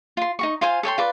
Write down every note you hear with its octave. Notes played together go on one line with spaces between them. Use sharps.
F4 C6
D#4 F#4 C#6
F4 C5 F5 G#5
A4 C#5 G5 C6
F4 B4 D5